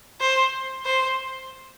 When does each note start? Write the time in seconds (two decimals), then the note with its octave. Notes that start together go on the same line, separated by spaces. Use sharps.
0.21 C5
0.85 C5